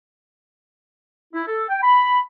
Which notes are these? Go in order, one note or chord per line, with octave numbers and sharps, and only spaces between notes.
E4
A4
G5
B5